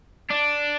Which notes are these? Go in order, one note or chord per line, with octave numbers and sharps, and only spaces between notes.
D4